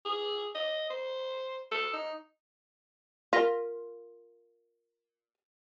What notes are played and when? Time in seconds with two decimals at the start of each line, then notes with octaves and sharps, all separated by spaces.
0.06 G#4
0.55 D#5
0.90 C5
1.71 A4
1.93 D#4
3.33 F4 A#4 A#6 B6